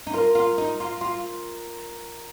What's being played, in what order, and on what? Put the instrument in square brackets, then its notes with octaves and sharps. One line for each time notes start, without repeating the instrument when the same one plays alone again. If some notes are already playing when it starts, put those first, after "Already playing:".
[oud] D#4
[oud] F4 [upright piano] A#4
[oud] F4
D#4
F4
F4